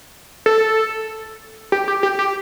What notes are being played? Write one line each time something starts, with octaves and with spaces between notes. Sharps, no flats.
A4
G4
G4
G4
G4